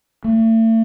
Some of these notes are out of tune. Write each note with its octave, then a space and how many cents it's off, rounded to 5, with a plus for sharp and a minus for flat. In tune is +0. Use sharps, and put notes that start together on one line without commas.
A3 +40